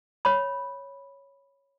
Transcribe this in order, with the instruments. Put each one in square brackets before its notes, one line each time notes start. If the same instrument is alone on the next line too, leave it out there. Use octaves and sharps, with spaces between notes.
[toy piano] C#5 B5